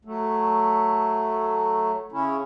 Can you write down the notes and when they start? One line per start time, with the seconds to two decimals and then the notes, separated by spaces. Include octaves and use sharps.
0.05 F#3 A3
2.12 C#3 C#4 E4